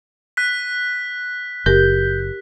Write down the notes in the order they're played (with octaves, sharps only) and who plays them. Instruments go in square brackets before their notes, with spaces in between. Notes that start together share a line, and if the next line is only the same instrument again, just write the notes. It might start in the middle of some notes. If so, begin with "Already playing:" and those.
[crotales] F#6 B6
[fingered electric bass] F#1 [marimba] G4 A#4 [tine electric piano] G6